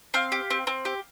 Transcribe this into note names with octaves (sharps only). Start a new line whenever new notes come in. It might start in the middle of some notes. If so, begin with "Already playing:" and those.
C4 F5
G4
C4
C4
G4